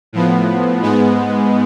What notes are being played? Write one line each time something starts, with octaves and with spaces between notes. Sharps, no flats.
A2 F3 B3
G#2 G#3 B3